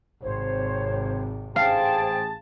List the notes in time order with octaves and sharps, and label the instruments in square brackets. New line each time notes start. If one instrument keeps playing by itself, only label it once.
[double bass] G#1 C3 [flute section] C5 C#5
[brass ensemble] A1 G#4 A5 [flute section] C5 G5 [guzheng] F5